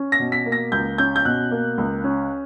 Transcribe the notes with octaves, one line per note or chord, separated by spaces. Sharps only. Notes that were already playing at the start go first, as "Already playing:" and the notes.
Already playing: C#4
A#6
B2
B6
A#3
A#6
C#2 G6
C#4 G6
G6
B2 F#6
A#3
C#2
C#4